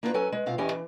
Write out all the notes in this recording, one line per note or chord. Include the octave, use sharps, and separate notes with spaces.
A#3 D4 D#4 F4 G#4 B4
F#3 C#4 A4 B4 G#5
G#3
B2 C4 F4 F5
E2 E3 C#4 G4 D#5 G#5
E3